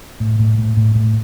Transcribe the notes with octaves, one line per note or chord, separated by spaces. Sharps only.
A2
A2
A2
A2
A2